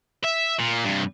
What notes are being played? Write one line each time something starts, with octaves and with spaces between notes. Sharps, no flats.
E5
A#2
G2 C3